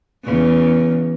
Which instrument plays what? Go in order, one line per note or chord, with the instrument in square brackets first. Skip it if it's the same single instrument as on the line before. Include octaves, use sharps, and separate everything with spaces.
[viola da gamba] E2 C#3